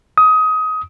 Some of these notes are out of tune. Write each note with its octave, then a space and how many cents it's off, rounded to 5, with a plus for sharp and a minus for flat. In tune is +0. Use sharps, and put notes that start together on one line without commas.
D#6 +20